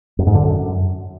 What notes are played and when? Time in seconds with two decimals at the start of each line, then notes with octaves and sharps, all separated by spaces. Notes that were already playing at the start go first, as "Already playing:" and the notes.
0.19 F#2
0.27 G#2
0.35 D3
0.43 F#2